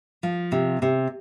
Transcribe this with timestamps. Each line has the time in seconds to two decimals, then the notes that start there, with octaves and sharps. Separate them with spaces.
0.23 F3
0.52 C3
0.82 C3